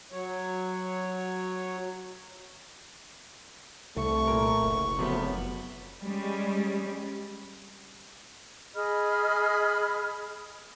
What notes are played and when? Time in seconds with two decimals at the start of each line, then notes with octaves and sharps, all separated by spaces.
0.12 F#3 C#5
3.96 C2 A3 C#6
4.28 A#2 A#4
4.63 F#1
4.99 C3 F3 F#3 A3 B3
6.02 G3 G#3 C#4
8.75 G#4 D#5 B5 F6